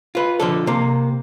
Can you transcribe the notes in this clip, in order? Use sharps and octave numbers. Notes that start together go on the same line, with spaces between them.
F4 B4
D3 F3 A4
C3 A#3